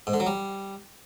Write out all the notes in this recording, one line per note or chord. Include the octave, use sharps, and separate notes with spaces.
G#2
D3
F#3
G3